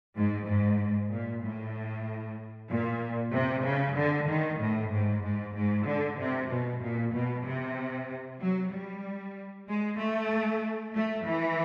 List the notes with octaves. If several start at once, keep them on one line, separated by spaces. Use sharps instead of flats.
G#2
G#2
A#2
A2
A#2
C3
C#3
D3
D#3
A2
G#2
G#2
G#2
D3
C3
B2
A#2
B2
C3
F#3
G3
G#3
A3
A3
E3